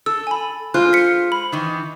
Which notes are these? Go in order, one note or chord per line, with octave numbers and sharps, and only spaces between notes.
A4 E6
G#5 B5
G#3 F4 C5 F#6
B6 C#7
B5
D#3 E3